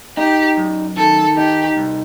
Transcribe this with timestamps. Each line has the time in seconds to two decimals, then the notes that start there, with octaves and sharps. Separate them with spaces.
0.17 D#4 G4
0.57 F#2
0.97 D#3 A4
1.37 D#4 G4
1.77 C2